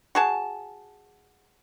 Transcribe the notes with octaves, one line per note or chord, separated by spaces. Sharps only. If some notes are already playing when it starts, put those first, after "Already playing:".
F#4 G#4 A5